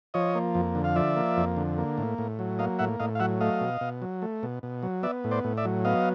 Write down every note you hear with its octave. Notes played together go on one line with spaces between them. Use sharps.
F3 C#5 D#5
A#3
F2
D3
F5
F3 D5 E5
A#3
F2
D3
A#3
A2
A2
F#3
A#3 D#5 F5
A2 E5 F#5
A2 D#5 F5
F5
F#3 E5 F#5
A3 D#5 F5
B2
B2
F#3
A3
B2
B2
F#3
B3 D5 E5
A2
C5 D5
A2
D5 E5
F#3
B3 D#5 F5